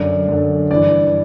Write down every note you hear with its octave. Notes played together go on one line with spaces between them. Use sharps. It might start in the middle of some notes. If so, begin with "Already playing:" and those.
Already playing: F#2 D3 D5
F#2 D3
G2 E3 D5